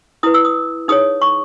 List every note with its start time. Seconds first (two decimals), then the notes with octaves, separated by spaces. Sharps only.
0.23 E4 B4 D#6
0.34 E6
0.45 D#6
0.88 D#4 G#4 C#5 D#6
1.22 C#6